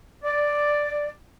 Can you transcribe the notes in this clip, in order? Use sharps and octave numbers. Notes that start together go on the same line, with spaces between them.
D5